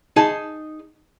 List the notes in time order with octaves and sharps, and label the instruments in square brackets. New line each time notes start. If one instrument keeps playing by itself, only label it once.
[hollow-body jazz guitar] D#4 G#4 A5